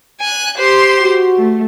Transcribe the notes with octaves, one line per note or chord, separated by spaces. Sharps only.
G#5 F#6
G4 C5 C6
F#4
A3